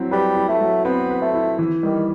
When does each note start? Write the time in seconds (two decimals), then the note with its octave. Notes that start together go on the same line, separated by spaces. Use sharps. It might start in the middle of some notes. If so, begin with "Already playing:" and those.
Already playing: F#3 C4 E4
0.11 G3 B4
0.36 E4
0.48 A3
0.61 F#3
0.84 B3 C4
1.10 B4
1.21 A3
1.35 E4
1.59 E3
1.83 D#3 G3